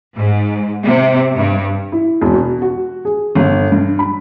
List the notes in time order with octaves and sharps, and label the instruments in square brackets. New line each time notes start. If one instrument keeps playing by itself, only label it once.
[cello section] G#2
C3
G2
[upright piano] E4
E1
B2
F#4
G#4
G1
G2
B5